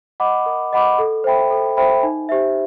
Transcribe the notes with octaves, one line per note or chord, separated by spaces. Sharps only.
D#5 F#5 B5 D6
A#4
D#5 F#5 B5 D6
A4
C5 E5 G5 B5
A4
C5 E5 G5 B5
D#4
G4 C5 E5